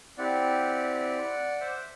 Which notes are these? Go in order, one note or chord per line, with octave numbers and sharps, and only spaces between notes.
C4 E4 G4 D5 F#5
C5 E5